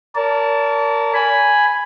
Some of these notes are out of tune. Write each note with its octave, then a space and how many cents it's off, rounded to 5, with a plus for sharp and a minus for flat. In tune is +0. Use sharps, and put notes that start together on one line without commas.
A#4 -5 D5 -45 A5 +0
G#5 +0 B5 +0